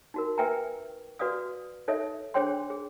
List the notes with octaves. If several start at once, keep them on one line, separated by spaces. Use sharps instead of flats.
D#4 F#4 A#4
A#4 B4 E5 G5 G#5 A#5
F#4 B4 D5 F5 D#6
D#4 A4 C#5 D#5 E5
D4 G#4 C5 C#5 G5 C6
G#4